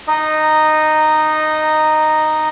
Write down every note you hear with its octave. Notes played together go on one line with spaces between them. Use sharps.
D#4 D#5